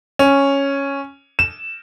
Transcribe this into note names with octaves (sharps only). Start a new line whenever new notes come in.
C#4
E7